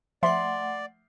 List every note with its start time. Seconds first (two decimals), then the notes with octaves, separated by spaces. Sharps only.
0.23 F3 A3 D5 E5 F#5 C6